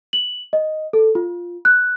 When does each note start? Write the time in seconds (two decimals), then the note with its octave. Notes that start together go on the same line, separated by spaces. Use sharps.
0.13 F#7
0.53 D#5
0.93 A4
1.15 F4
1.65 F#6